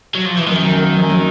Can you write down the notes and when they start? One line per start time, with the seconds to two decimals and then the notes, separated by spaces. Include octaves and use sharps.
0.15 F#3
0.26 F3
0.37 E3
0.47 F#2 D#3
0.63 F#2
0.78 A#3
0.93 F#2
1.09 F#3